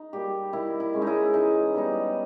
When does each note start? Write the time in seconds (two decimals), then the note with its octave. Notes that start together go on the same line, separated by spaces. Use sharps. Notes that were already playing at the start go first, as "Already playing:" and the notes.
Already playing: D#4
0.13 G3 A#3 G4
0.53 D#3 E4
0.80 E4
0.93 G#3 C#4
1.02 D#4
1.07 E4
1.34 E3 D#4
1.74 G3 B3 D#4